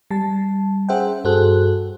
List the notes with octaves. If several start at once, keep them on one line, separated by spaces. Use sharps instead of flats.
G3 A5
C#4 G#4 C5 E5 F#5 G5
G2 F#4 G#4 A4 C5 F#6